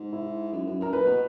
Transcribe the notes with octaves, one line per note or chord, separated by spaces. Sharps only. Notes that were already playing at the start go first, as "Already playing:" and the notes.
Already playing: G#2
E4
F#2
F#2
F#2 A#4
A#2 B4
B2